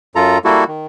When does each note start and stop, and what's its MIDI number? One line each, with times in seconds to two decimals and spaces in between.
0.15 0.38 42
0.15 0.38 65
0.15 0.38 69
0.15 0.38 82
0.44 0.64 55
0.44 0.64 58
0.44 0.64 64
0.44 0.64 66
0.44 0.64 69
0.68 0.87 51